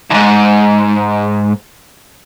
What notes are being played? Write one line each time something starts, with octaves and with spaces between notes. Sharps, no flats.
D#2 G#2